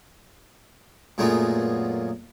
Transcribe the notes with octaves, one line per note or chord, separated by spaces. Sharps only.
F#2 A#2 G#3 A3 B3 F4